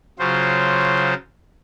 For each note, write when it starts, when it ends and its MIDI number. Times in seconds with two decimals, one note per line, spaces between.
0.19 1.14 49
0.19 1.14 54
0.19 1.14 65
0.19 1.14 72